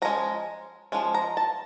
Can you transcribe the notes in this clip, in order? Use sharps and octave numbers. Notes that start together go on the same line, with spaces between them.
F3 G#3 C#4 A#5
F3 G#3 C#4
A#5
A5